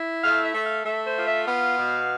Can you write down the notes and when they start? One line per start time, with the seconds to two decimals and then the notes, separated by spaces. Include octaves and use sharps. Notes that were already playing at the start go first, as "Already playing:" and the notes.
Already playing: E4
0.23 A3 F5
0.44 E5
0.54 A3
0.64 F5
0.85 A3 E5
1.06 C5
1.16 F4
1.27 E5
1.47 B3 F5
1.78 B2